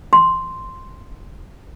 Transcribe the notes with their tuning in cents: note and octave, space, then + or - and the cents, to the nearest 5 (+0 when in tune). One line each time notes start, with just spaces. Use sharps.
C6 +0